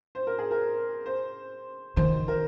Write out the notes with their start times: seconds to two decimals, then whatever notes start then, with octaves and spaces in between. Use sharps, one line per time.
0.15 C5
0.27 A#4
0.39 G#4
0.51 A#4
1.06 C5
1.96 D#3 C5
2.28 A#4